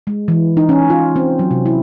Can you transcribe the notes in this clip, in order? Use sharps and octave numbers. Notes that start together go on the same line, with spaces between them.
G#3
E3
D#4
C#4
F4
C4
F#3
C3
E4